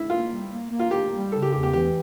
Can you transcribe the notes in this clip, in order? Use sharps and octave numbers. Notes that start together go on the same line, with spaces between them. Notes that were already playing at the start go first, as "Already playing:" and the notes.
Already playing: E4
A#3 F4
G3
A#3
A#3
F4
A#3 G4
G3
C#3 A4
G4
E2 G4
G4
E3 G4